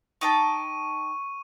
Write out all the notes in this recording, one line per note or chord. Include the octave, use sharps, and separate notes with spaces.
D#4 G5 A5 C#6 D#7